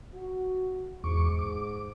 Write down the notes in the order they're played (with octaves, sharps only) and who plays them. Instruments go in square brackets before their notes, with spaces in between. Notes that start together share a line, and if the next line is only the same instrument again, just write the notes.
[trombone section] F#4
[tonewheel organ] E2 C#6 D6 [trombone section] G#2
[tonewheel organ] D6